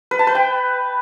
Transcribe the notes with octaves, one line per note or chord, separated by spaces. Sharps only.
B4
A5
B4
G5